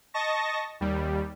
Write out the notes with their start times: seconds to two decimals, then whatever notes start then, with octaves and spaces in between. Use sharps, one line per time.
0.14 D#5 A5 C#6 A#6
0.80 D#2 G3